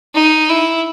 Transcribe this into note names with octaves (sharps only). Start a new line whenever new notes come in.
D#4
E4